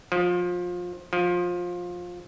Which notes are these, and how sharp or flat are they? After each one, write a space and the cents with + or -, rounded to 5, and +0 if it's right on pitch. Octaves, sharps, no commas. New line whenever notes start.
F3 +25
F3 +20